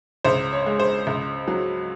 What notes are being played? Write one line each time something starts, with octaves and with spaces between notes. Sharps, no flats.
C#2 C5
C#5
G#3
C5
C#2
F#3